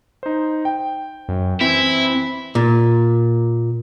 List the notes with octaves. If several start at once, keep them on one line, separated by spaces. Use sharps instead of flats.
D#4 C5
G5
F#2
E3 C4 E4
A#2